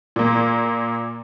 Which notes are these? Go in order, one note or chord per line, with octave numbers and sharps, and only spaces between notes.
A#2 A#3